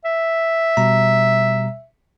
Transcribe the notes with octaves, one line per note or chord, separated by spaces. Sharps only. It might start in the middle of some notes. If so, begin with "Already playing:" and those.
E5
B2 G3 A#5